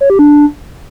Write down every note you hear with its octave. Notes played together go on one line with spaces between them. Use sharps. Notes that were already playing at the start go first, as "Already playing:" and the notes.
C#5
G4
D4